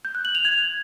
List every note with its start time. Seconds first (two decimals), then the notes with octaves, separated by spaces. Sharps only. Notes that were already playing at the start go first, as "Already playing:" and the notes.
0.05 G6
0.15 F#6
0.25 F#7
0.35 F7
0.45 G#6